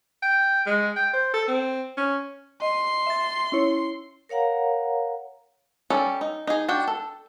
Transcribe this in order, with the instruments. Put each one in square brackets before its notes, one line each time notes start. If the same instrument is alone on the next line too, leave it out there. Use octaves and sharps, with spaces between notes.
[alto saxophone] G5
G#3
G5
C5
A4
C4
C#4
[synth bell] D#5 [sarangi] C6
[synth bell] E5 A6
C#4 E4 C#5
[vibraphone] A#4 C#5 F5 F#5 A#5
[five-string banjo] G3 C#4 A4
D#4
D#4 G#4
D4 F#4 G5
A4